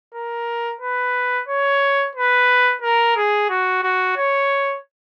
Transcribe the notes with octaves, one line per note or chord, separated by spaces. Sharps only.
A#4
B4
C#5
B4
A#4
G#4
F#4
F#4
C#5